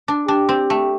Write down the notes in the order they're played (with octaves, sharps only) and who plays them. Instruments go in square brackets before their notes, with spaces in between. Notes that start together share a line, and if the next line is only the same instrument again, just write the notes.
[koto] D4
[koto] D4 [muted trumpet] G4
[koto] C4
A3